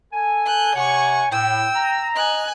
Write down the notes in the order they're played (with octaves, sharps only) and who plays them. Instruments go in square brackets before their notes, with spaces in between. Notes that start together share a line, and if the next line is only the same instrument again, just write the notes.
[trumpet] A4 [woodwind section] G#5
[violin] F#6 G6
[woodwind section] C3 F#5 [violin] C#5 C#6 [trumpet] G#5
[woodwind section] A2 [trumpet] G5 [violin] E6
[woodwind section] A#5
[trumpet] D#5 [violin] G#5 F#6